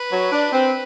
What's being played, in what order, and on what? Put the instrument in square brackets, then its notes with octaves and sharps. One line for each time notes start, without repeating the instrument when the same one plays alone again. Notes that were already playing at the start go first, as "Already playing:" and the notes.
Already playing: [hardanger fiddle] B4
[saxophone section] F#3
D4
C4